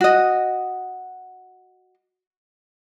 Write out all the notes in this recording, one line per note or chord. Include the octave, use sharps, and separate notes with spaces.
F#4 D#5